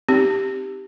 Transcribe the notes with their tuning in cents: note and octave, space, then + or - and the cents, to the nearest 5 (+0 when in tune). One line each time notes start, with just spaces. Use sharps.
C4 +0 D#4 +0 G4 +0